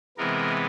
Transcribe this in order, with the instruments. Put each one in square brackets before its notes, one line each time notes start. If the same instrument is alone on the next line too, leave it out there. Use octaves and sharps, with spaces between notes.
[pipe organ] C3 E3 G#3 B3 A#4